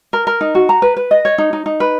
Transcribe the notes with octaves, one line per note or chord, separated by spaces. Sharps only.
A#4
A#4
D#4
F#4
A#5
B4
B4
D#5
C#5
D#4
D#4
D#4
B4